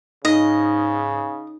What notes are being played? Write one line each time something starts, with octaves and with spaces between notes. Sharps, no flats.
G#2 C#3 D#4 D#5